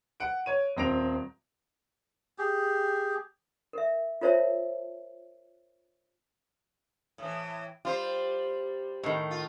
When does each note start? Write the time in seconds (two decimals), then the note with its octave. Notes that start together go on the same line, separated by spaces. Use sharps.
0.20 F#5 D7
0.46 C#5 D#7
0.77 D#1 C4 A#6 D7 F7
2.38 G4 G#4
3.73 A#4 E5
4.21 F4 A#4 C5 C#5 E5 A5
7.18 A2 E3
7.85 G3 F4 C5
9.03 A2 D#3
9.31 F4